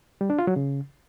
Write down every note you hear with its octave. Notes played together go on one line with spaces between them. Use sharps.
G3
D4
F4
F#3
C#3